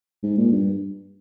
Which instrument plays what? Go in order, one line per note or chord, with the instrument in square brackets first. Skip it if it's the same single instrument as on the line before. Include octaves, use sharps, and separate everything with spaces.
[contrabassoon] G#2
A#2
G2